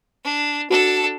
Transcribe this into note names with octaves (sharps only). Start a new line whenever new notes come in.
D4
D4 F#4 A4